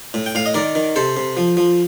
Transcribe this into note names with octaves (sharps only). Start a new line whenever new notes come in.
A2
G5
A2 F5
D#5
D#3 A#4 D5
D#3
C3 A4 C5
C3
F3
F3